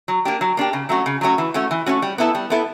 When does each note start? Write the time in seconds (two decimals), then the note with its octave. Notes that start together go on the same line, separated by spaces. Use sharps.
0.08 F#3
0.25 A#3 D4 G4
0.41 F#3
0.57 A#3 D4 G4
0.73 C#3
0.89 F#3 A3 C#4 F#4
1.06 C#3
1.21 F#3 A3 C#4 F#4
1.38 E3
1.54 A3 C#4 F#4
1.71 E3
1.86 A3 C#4 F#4
2.02 G3
2.18 B3 E4 A4
2.35 G3
2.50 B3 E4 A4